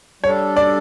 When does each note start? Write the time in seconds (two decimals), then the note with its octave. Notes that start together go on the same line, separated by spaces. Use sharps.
0.23 G3 D4 A4 C#5
0.57 D5